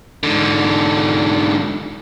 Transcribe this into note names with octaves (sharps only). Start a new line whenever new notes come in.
G#2 D3